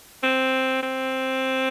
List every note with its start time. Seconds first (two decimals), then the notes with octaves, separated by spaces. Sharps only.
0.23 C4
0.83 C4